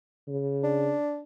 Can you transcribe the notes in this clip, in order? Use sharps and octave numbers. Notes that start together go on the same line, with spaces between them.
C#3
D4